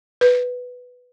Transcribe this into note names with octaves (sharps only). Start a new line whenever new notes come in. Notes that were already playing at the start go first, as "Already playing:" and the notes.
B4